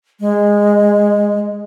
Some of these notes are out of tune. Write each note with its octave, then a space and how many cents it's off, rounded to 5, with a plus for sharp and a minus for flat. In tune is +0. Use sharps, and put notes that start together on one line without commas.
G#3 -15